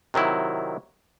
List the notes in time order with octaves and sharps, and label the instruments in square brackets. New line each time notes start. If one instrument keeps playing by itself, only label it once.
[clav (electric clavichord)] C3 D#3 F#3 E4